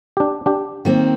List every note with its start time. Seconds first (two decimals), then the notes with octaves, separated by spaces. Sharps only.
0.17 D4 G4
0.46 D4 G4
0.85 D#3 A#3 C4